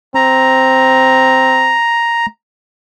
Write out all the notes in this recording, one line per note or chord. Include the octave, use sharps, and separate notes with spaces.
C4 A#5